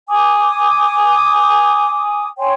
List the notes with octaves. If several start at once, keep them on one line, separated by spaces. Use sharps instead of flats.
G#5 D6 D#6
C#5 G5 G#5 C6